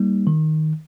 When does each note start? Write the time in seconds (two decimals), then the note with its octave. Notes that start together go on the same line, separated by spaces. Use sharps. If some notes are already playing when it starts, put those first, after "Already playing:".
Already playing: G3 A#3 D#4
0.27 D#3